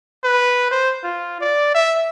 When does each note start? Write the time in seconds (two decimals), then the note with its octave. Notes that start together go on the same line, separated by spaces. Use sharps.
0.24 B4
0.71 C5
1.04 F4
1.41 D5
1.74 E5